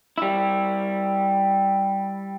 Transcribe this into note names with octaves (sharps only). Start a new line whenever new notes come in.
G3 E4